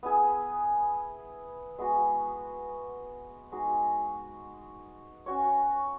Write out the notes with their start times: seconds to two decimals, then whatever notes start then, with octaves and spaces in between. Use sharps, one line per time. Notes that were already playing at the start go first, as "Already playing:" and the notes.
0.03 B3 E4 G#4
1.78 G#3 B3 F#4
3.52 G#3 D#4 F#4
5.26 C#4 F#4 C#5